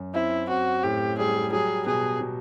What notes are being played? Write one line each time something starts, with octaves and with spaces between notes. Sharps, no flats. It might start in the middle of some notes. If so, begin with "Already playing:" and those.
Already playing: F#2
C4 E4
C4 F#4
A2 G4
G3 G#4
F#3 G#4
B2 G#4
B2